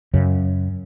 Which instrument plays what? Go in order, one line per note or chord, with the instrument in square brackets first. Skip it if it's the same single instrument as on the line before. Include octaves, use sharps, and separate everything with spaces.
[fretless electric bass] F#2 C#3